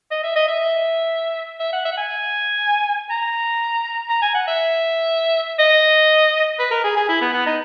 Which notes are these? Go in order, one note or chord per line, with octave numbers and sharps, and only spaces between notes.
D#5
E5
D#5
E5
E5
F#5
E5
F#5
G#5
A#5
A#5
G#5
F#5
E5
D#5
B4
A#4
G#4
G#4
E4
B3
B3
D#4